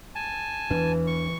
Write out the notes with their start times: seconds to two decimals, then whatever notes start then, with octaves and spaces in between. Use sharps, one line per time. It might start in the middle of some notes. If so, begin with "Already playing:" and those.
0.15 G#5 A5
0.70 E2 E3 D4 B4
1.07 C#6